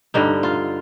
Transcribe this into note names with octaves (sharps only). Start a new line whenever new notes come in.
G2 D3 G3 D#4
F4